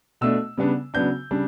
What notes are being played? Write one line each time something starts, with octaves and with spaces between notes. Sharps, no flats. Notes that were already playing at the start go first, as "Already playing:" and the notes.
B2 A3 D4 E6
C#3 G3 B3 D4
C#3 F#3 B3 D4 G6
C#3 G3 D4